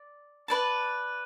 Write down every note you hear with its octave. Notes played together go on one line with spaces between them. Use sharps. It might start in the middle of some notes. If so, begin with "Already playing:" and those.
Already playing: D5
B4 D5 A5